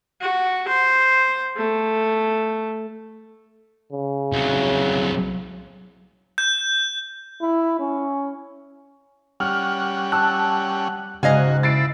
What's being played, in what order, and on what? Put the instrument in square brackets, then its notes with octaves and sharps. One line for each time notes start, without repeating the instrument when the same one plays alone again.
[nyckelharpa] F#4
C5
A3
[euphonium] C#3
[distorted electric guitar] C2 F#3
[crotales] G6
[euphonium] E4
C#4
[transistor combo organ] G3 C#4 F#5 [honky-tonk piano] F6
[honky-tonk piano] A5 E6 [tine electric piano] F#6
[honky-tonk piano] G#2 [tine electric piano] C#3 [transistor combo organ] F#4 [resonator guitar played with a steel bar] D#5 F5 G#5
[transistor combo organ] E4 [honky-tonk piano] A6 C7 D7